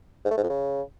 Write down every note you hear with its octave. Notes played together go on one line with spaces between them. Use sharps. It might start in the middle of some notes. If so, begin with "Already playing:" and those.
G#2
A3
G#2
F2
C#3